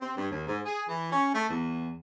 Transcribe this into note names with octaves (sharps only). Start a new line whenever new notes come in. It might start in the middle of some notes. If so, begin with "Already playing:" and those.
C4
G2
D#2
G#2
G#4
E3
C#4
A3
E2